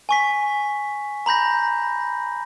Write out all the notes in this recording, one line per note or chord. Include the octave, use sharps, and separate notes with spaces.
G#5 C#6 B6
A#5 B5 G6 A#6